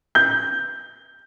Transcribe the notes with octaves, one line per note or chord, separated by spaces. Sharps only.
G6